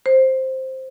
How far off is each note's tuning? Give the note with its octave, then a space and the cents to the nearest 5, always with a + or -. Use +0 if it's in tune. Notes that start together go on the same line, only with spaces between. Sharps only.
C5 +5